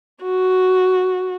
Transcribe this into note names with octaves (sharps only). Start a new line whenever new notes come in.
F#4